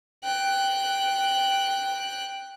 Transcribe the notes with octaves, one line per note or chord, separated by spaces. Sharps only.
G5 F#6